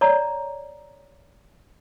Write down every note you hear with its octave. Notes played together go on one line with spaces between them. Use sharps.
C#5 D5 A#5